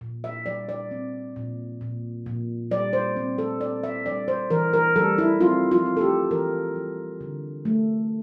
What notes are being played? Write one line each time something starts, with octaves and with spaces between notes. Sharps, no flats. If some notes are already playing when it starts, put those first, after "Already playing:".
A#2
E5
G3 D5
D5
C4
A#2
A#2
A#2
G3 D5
C5
C4
A4
C4 D5
E5
G3 D5
C5
E3 A#4
A#4
G3 A4
E4
C4 F4
F4
C4
A4
G4
E3 A#4
G3
D3
A3